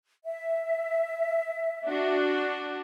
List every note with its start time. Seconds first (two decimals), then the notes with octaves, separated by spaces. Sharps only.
0.25 E5
1.86 D4 F#4